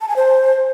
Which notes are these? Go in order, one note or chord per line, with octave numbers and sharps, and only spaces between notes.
A5
G#5
C5